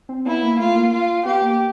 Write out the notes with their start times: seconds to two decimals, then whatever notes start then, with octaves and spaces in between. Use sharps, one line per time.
0.09 C4
0.26 B3 E4
0.43 A#3
0.59 A3 F4
0.75 A#3
0.92 F4
1.25 B3 G4
1.42 A#3